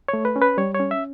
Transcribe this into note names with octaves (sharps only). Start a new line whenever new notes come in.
A3 C#5
B4
C#4
B4
G3 C#5
C#5
C#4
E5